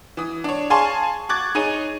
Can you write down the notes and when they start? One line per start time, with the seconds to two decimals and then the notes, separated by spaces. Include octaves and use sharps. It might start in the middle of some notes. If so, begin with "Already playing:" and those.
0.17 E3 D#6
0.44 D4 C#5
0.70 G#4 F5 G#5 A5 C6 C#6
1.29 C#6 D6 F#6 G#6 A6
1.55 D#4 G#4 C#5 D#7